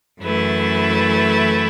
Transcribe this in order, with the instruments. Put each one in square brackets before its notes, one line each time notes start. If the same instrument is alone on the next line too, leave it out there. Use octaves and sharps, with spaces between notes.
[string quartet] F#2 E3 A3 E4 B4